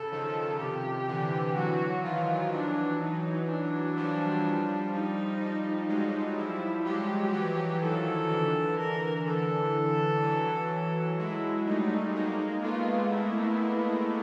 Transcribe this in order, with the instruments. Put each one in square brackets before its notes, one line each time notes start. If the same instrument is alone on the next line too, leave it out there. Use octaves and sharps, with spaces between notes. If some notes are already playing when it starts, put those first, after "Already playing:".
Already playing: [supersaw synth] C#3 [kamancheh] A4
[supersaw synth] D#3 F3
[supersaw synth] C3 [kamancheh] G4
[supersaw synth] D3 E3
[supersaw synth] E3 F#3 [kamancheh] F#4
[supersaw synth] D#3 F3 [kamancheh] F4
[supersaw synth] E3 F#3 [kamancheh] D4
[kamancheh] D#4
D4
[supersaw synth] F3 G3
[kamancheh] D#4
[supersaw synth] F3 G3
[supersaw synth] F#3 G#3 [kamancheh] D#4
[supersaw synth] F3 G3 [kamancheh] E4
[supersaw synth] F#3 G#3 [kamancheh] G4
[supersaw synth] E3 F#3
[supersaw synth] D#3 F3 [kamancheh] A4
[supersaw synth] D3 E3
[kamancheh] A#4
[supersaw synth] D3 E3 [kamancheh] A4
[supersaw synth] E3 F#3
[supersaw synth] F#3 G#3 [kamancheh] E4
[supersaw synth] G3 A3 [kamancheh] D#4
[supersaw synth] G#3 A#3 [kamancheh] D#4
[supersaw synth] A3 B3 [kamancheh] F4
[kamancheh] E4